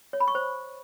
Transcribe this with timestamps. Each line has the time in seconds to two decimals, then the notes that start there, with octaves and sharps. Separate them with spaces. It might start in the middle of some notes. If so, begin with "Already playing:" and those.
0.13 C#5
0.20 B5
0.28 C#6
0.35 C5